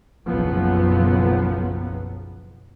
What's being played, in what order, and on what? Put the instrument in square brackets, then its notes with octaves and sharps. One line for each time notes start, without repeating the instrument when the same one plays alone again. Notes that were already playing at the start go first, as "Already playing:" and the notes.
[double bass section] F#1 B1 F3 F#3 B3